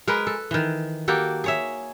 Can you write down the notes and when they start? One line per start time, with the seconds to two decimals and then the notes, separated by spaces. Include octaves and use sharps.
0.07 G#3 G#4 A#4 B4
0.27 A4
0.51 D#3 E3
1.08 A#3 F#4 G4 A4
1.44 G#4 C#5 E5